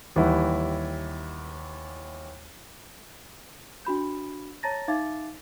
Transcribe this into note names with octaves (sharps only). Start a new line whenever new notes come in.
D#2 E3 G3 E4 F#5
D4 F#4 B5 G6
C#5 A5 A#5 A6 A#6
D#4 E5 F5 D6 A6